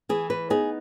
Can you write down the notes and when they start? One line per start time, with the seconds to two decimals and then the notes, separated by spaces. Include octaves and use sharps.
0.09 E3 G#4
0.30 B4
0.50 B3 D#4 G#4